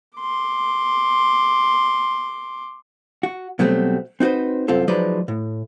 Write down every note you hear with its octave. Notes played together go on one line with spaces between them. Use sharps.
C6 D6
F#4
B2 F#3 G3 A3 C4
C4 D#4 F#4 B4 C5
C2 F#2 C4 F4 A4
F3 F#3 G#3 D#4 B4 D5
A2